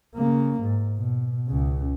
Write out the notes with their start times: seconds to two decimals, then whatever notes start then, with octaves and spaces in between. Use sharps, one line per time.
0.15 C#3 A#3
0.62 G#2
0.98 B2
1.48 C#2 C#3